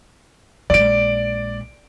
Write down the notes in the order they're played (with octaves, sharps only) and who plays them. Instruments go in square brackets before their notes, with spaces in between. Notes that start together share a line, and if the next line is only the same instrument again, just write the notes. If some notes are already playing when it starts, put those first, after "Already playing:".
[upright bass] A#1 G#3 [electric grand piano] D5 D7